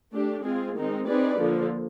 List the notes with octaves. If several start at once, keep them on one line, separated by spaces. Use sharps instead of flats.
A3 D4 G4
G#3 C4 F4 G#4
D#3 G#3 C4 D#4
C4 D#4 G#4 B4 D5
D3 F3 A#3